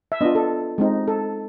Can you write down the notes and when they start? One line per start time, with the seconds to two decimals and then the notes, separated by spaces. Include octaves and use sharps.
0.12 E5
0.21 B3 D4 F4 D#5
0.35 A4
0.78 G#3 C4 D#4
1.08 A4